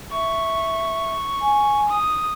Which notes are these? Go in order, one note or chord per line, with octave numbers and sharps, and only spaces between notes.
E5 C#6
G#5
D#6